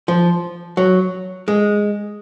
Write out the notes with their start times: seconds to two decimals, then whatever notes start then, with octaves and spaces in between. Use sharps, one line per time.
0.08 F3
0.77 F#3
1.48 G#3